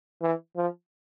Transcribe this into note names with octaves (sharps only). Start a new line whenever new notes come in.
E3
F3